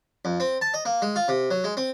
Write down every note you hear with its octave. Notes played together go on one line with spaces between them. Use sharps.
F2
C4
A5
D#5
A#3
G#3
F4
C3
F#3
G#3
C4